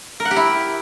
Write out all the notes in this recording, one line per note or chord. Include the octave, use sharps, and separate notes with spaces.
A#4
F#5
G4
E4